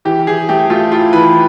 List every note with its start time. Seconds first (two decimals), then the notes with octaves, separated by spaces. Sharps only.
0.05 E3 G4
0.27 E3 G#4
0.49 A3 G4
0.70 A3 F4
0.92 E4 F4
1.13 E3 B4